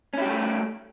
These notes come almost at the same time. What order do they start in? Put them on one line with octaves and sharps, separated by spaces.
C#4 E4 G4 G3 A3